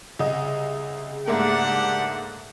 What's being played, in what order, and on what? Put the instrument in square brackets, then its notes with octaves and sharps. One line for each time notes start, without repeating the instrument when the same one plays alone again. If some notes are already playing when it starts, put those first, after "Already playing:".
[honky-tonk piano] C2 D#5 [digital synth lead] C#3
[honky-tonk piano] G#2 A3 A#3 [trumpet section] D4 G4 F#5